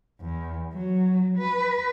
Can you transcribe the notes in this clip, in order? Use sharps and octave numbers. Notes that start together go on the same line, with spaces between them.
E2
F#3
B4